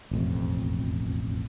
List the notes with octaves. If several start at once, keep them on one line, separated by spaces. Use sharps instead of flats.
E1 A1 F2